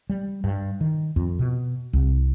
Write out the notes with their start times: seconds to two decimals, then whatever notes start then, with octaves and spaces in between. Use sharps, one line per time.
0.10 G3
0.44 G2
0.81 D#3
1.16 F2
1.39 B2
1.93 C2